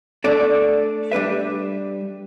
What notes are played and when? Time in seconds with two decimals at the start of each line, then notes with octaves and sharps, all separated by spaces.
0.24 A3 D4 A4 D5
1.12 G3 D4 B4 E5